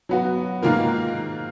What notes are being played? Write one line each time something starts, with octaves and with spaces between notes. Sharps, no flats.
F#3 B3 F#4
G#2 D#3 A#3 F4 A#4